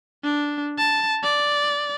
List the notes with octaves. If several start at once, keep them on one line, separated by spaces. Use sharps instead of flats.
D4
A5
D5